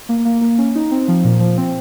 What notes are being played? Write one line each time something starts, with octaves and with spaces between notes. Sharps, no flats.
A#3
A#3
A#3
C#4
D#4
C4
F3
A#2
F3
C4